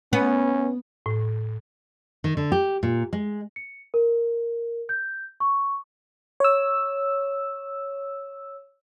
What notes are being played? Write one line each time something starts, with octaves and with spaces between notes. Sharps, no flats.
B3 C#4
A2
D#3
D3
G4
A#2
G#3
C#7
A#4
G6
C#6
C#5 E6